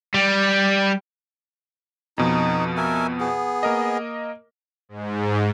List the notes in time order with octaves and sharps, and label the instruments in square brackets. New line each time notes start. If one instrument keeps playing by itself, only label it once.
[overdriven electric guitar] G3
[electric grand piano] F2 B2 F3 [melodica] D#4
[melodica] A#4 E5 G#5
B3 G#4
[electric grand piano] A#3 A#4 D#5
[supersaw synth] G#2